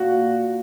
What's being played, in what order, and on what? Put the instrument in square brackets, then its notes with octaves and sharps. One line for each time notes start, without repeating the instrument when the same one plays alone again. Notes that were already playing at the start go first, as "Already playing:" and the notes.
Already playing: [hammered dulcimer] A#2 [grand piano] F#4